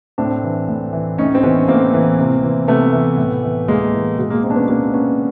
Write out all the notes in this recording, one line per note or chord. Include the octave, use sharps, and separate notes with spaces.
A2 C4 D4
E3
A2
E3
A2 C#4 D#4
C4
E3 B3 C#4
A2 A#3 C4
E3
C3
E3
C3 A3 B3
E3
A2
E3
A2 G#3 A#3
E3
B2 G#3
G#3 A#3
A#3 C4
D4
B3 C#4
B2 A#3 C4
B3 C#4